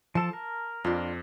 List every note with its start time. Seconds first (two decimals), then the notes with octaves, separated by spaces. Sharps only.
0.15 F3 A4 A5
0.33 A#4
0.85 F2 D4 F4